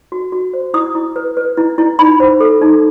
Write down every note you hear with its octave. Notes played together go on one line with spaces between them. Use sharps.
F#4
F#4
C5
E4 D#6
E4
B4
B4
E4
E4
D#4 B5
C5
A4
D#4